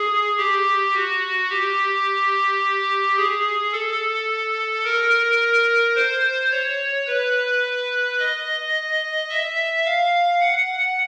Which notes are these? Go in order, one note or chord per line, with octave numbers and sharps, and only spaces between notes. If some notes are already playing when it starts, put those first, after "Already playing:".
Already playing: G#4
G4
F#4
G4
G#4
A4
A#4
C5
C#5
B4
D#5
E5
F5
F#5